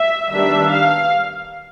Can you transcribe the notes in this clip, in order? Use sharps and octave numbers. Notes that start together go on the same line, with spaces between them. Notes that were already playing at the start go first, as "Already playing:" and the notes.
Already playing: E5
D#3 G3 B3 D4 E5
F5